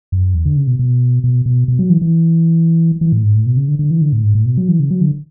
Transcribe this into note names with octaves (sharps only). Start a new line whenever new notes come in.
F#2
E2
D3
C#3
B2
B2
B2
B2
B2
F#3
E3
E3
E3
A2
G#2
A2
B2
C#3
D3
D3
E3
D3
A2
G#2
A2
B2
F#3
E3
C#3
F#3
D3